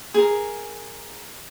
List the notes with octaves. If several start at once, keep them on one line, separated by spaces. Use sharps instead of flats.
G#4 A#4